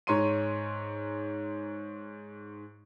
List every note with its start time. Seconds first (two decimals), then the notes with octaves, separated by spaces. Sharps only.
0.07 G#2 C#5 A#5 C6 D#7